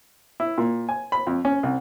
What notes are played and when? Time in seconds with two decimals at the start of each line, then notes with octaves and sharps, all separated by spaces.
0.40 E4
0.58 A#2
0.89 G#5
1.12 B5
1.27 F2
1.45 C#4
1.63 C2